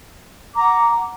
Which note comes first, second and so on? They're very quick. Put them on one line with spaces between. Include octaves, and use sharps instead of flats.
D6 A#5 F#5